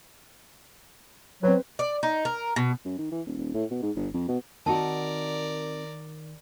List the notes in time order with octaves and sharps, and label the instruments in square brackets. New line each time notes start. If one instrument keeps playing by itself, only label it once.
[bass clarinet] F#3 [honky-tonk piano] C4 B4
[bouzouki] D5
D#4
A#4
B2
[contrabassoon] F#2
D#3
E3
D#1
D#1
A2
B2
G#2
G1
F2
B2
[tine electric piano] D#3 [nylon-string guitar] C4 D#4 F#4 [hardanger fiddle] A#4 D5 [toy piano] A5